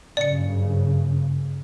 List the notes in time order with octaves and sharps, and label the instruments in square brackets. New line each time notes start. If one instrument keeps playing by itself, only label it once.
[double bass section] F#1 G2 C#3 [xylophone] D5 C#7